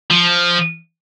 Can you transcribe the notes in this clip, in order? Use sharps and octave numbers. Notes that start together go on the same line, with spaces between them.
F3